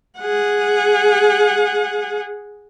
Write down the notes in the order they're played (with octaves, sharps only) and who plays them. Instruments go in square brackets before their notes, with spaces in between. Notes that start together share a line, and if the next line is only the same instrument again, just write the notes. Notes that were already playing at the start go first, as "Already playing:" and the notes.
[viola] G#4 F#5